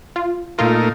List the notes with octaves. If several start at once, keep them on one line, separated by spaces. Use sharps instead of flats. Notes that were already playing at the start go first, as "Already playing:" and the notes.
F4
A#2 A3 D#4 F4 A#4